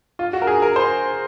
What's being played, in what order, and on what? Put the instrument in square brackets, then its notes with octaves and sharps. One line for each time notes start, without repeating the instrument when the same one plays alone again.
[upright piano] F4
F#4
A#4
G#4
A#4
C5